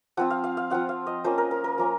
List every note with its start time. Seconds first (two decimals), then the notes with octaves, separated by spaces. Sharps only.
0.17 F3 C4 F4 F#5
0.30 F5
0.44 F5
0.57 F5
0.70 F3 C4 F4 F#5
0.89 F5
1.07 D#5
1.24 F3 A#3 C#4 C5
1.38 A#4
1.51 A#4
1.64 A#4
1.78 F3 A#3 C#4